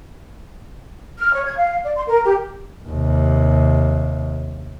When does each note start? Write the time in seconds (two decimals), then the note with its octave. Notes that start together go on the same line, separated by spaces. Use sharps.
1.18 F6
1.33 C#5
1.45 G#6
1.58 F5
1.84 D5
1.96 C6
2.08 A#4
2.24 G4
2.88 D#2 C3